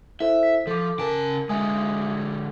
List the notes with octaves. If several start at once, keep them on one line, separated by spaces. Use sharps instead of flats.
E4 A4 C5 E5
B6
F3 A4 D6
C#3 A#4 G#5 A5 D7
D3 G#3 E5 G#5 D#6